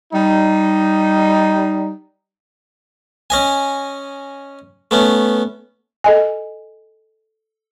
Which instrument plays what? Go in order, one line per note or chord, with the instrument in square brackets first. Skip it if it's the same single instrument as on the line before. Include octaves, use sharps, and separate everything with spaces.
[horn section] G3 D#4
[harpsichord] C#4 D#5 G#5
A3 B3 C#4
[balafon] A4 D#5 G#5